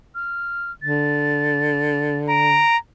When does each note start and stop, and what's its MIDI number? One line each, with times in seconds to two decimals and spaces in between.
0.15 0.71 89
0.82 2.63 50
0.82 2.17 93
2.29 2.78 82
2.29 2.75 98